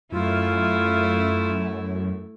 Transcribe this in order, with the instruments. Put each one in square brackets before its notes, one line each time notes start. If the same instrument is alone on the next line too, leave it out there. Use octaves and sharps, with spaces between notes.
[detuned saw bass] F#2 [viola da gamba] A3 E4 [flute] F4